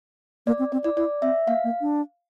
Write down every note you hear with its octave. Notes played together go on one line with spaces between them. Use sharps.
A#3 D5
C4
C4 D5
E4 D5
E4 D5
C4 E5
A#3 F5
A#3
D4